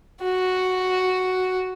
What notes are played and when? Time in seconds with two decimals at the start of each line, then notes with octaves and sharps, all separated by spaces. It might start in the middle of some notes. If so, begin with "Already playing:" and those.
0.23 F#4